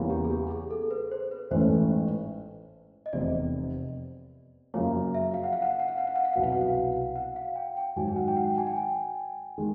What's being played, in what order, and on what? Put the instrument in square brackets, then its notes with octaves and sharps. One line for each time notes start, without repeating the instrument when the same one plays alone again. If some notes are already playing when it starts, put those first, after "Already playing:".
Already playing: [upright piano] E2 C#3 E3 G3 A#3
[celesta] G4
G#4
G4
G#4
A4
B4
C5
B4
[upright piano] A1 G#2 E3 A3 C#4 [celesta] C5
[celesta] D#5
[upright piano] F1 E2 C3 [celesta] D5
[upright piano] F#2 C#3 F3 A#3 [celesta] C#5
[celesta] E5
F5
F#5
F5
F#5
F5
F#5
F5
F#5
F5
F#5
F5
[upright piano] C2 B2 F#3 B3 [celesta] F#5
[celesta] F5
F#5
F5
F#5
F5
G5
G5
[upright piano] G#2 D#3 F#3 [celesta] G#5
[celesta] G5
F#5
G5
F#5
G#5
G5
G#5
[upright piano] D#3 G#3